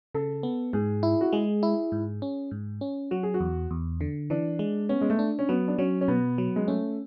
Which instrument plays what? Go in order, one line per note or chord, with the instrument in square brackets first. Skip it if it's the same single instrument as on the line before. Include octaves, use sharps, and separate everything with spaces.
[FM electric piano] C#3 [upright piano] A4
[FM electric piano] B3
[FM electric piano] G#2 [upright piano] G#4
[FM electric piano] E4
[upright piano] F#4
[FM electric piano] G#3 [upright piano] G#4
[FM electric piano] E4
G#2
C#4
G#2
C#4
[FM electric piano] F#3 [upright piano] F#4
[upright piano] G#4
F#4
[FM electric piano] E2
E2
D3
[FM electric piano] E3 [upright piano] D4
[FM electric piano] G#3
[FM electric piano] B3 [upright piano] C#4
[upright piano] G#3
A3
[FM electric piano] D4
[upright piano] C#4
[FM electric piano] F#3 [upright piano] B3
[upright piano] D4
[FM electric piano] F#3 [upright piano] C#4
[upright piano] C#4
[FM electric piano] B2 [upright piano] B3
[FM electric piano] F#3
[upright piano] G#3
[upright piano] A3 [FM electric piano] C#4